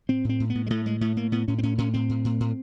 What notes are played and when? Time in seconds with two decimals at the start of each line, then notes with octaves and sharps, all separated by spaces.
0.09 A2 C4
0.24 A2 C4
0.40 A2
0.50 B3
0.55 A2
0.66 G#3
0.70 A2 A3
0.86 A2 G#3
1.01 A2 A3
1.17 A2 A#3
1.32 A2 B3
1.48 A2 C#4
1.58 C4
1.63 A2 C#4
1.78 A2 C#4
1.94 A2 C4
2.10 A2
2.25 A2
2.40 A2